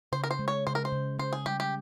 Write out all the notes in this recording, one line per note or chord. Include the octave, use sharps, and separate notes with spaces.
C#3 C5
A#4
C5
G#3
C#5
C#3 C5
A#4
C5
C#3
C#4 C5
G#4
G3 G4
G4